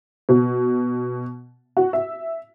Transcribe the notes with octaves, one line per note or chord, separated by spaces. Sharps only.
B2
F#4
E5